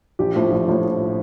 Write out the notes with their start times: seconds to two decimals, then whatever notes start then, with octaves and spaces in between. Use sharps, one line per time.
0.19 A#1 G4
0.35 A2 F3
0.52 A#1
0.68 A2 F3